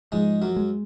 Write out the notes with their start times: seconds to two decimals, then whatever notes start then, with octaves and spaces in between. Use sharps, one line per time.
0.12 G#2 F3 G#3
0.42 F#2 F#3
0.56 G#3